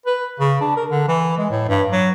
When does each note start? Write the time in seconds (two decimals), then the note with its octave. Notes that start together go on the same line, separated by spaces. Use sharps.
0.06 B4
0.40 C#3
0.61 D4
0.77 A#4
0.90 D3
1.08 E3
1.38 G#3
1.51 A2
1.69 G2
1.91 F#3